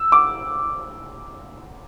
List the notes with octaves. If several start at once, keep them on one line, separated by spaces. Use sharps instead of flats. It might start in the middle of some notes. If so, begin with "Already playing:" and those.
Already playing: E6
D6